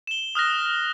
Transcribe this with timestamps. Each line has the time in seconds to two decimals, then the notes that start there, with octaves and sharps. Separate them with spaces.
0.07 E7 G7
0.35 D#6 F6 F#6 A#6